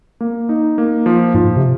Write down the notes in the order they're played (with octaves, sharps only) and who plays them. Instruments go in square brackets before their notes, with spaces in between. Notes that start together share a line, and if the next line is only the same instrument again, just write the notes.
[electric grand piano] A#3
D#4
A#3
F3
[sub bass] G#2 [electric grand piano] F3
[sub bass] C3